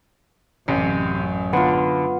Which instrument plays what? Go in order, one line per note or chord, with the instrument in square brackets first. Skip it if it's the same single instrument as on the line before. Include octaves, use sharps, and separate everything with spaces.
[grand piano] A1 [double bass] F#2 [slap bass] C3
[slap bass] D3 [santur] B3 F4